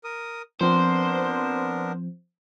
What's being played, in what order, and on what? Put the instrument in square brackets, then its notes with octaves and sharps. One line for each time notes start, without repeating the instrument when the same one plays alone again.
[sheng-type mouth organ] A#4 D#6
[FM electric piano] F3 C4 [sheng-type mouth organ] B3 D4 A#4 [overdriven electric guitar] C5